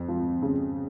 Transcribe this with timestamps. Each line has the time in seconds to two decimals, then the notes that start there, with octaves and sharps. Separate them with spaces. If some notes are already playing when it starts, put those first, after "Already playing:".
Already playing: F2
0.08 F3
0.42 C#3